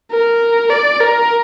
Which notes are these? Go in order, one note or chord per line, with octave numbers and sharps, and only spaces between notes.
A#4
D5
A#4